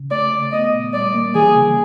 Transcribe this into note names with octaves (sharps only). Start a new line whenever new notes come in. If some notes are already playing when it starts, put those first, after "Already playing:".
Already playing: C#3
A3 D5
A3
B3 D#5
A#2
G3 D5
A#3
E3 G#4
C#3